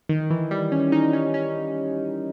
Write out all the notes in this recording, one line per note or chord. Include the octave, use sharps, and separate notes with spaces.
D#3
E3
G3
C#4
D#4
C#4
C#4